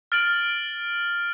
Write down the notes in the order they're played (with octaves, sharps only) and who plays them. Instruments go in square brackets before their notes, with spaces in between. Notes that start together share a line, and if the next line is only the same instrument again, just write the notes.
[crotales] F6 A6 D7 F#7